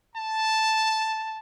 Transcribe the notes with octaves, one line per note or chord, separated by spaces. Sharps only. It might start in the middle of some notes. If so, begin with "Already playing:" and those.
A5